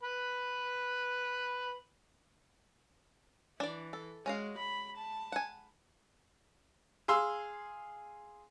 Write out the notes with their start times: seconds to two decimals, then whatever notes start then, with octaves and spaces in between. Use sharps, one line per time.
0.03 B4 B5
3.60 E3 D4 D5
3.93 A4
4.26 G#3 C#4 F#4 F5
4.58 B5
4.97 A5
5.32 F#5 G#5
7.08 G#4 F5 C6 E6